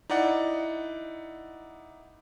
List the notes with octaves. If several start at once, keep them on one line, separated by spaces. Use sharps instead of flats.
D#4 E4 D5 F#5